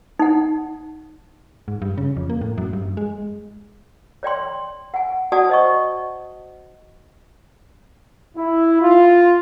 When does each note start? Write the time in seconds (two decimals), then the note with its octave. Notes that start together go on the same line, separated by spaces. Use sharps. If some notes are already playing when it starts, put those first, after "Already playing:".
0.19 D#4 F#5
1.68 G#2
1.82 G2
1.98 C#3
2.17 F2
2.30 A#3
2.41 A2
2.58 F#2
2.73 G2
2.97 G#3
4.23 C#5 D5 G5 C6
4.94 F#5 G#5
5.32 F#4 D5 F#5 A5 D#6
5.49 C5 D#5 C#6
8.36 E4
8.82 F4